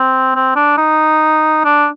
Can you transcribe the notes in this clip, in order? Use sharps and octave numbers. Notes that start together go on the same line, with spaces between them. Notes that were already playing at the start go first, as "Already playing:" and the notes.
Already playing: C4
C4
D4
D#4
D4